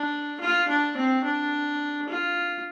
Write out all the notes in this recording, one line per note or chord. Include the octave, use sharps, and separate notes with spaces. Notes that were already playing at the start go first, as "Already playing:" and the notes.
Already playing: D4
F4
D4
C4
D4
F4